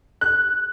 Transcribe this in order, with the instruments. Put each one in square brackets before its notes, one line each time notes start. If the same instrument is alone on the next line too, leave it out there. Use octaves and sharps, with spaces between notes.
[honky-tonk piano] F#6